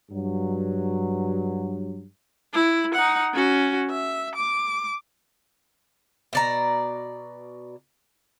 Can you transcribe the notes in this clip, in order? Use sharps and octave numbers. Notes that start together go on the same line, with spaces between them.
G2 F#3
E4
D#4 F#5
C#4 F#4
E5
D6
B2 D5 A#5